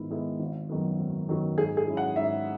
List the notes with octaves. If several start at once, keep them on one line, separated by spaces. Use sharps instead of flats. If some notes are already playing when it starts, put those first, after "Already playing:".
Already playing: G#2 D#3 G#3 B3 E4
D#3 G#3 B3 E4
G#1
F#2 D#3 F#3 B3
G#1
F#2 D#3 F#3 B3
G#2 G#4
G#4
F#3 C#4 E4
F#5
G#2 E5